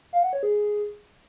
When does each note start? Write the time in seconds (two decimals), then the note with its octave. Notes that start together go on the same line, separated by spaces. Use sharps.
0.13 F5
0.23 F#5
0.33 C#5
0.43 G#4